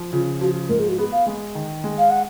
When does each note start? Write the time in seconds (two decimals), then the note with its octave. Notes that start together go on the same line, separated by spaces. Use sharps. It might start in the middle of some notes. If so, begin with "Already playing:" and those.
Already playing: F3
0.12 C#3 F4
0.41 F3 F#4
0.69 G#2 A#4
0.80 G#4
0.89 F#4
0.98 B3 G#4
1.12 F5
1.26 G#3
1.55 D#3
1.84 G#3
1.99 F5
2.10 F#5